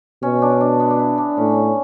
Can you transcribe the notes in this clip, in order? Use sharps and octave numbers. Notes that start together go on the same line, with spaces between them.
B2 C#4
D4
D4
B3
D4
E4
D4
A2 C#4